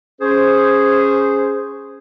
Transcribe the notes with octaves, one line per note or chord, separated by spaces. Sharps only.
C#4 G#4 C5